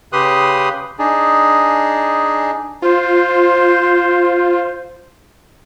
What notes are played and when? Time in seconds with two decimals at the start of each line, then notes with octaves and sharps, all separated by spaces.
0.13 C#3 G4 B4 C6 D#6 F#6
0.99 D4 D#4 G#4
2.82 F4 C5